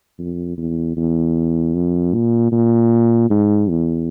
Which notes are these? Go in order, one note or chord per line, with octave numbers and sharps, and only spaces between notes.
F2
E2
E2
F2
A#2
A#2
G#2
E2